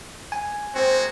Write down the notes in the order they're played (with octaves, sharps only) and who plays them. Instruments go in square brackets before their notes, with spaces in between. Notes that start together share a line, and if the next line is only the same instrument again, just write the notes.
[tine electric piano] G#5
[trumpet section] G#3 A#3 F#4 [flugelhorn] C4